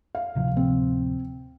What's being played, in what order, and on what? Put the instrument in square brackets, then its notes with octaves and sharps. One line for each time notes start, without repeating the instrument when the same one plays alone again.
[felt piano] F5
[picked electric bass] D1 C3 F3
[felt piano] C4